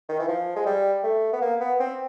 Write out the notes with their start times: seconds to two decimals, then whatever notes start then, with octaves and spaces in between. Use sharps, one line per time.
0.09 D#3
0.19 E3
0.28 F3
0.56 G#3
0.66 G3
1.03 A3
1.33 B3
1.42 A#3
1.60 B3
1.80 C4